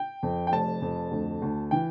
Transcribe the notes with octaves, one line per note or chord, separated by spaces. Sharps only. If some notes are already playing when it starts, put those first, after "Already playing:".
Already playing: G5
F2
G5
F1 A5
F2
D2
D2
E3 G5